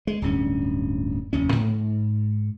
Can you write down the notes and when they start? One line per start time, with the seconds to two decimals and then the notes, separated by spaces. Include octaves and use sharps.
0.07 G#3
0.22 D1 G2 C#4
1.33 F1 D#2 C#4
1.52 G#2